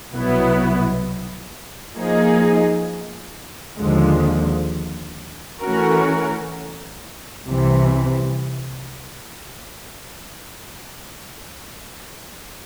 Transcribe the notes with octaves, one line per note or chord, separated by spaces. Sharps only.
C2 B2 F#3 B3 E4
F3 A#3 D#4 G#4
D#2 D3 F3 G#3
E3 A3 C#4 F#4 A#4
C2 C3 E3